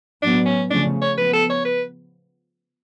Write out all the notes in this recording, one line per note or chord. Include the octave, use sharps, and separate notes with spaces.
A2 F#3 B3 D4
C#4
C#3 F3 A3 C#4 D4
C#5
F3 B3 B4
A4
C#5
B4